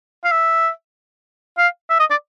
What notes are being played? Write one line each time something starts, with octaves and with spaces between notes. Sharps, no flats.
F5
E5
F5
E5
D#5
D5